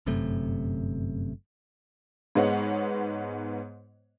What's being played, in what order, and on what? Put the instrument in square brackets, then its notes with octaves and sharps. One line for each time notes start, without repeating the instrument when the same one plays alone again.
[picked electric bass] G1 F#2 C3 A3
[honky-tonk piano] G#2 G#3 B3 C#5 F#5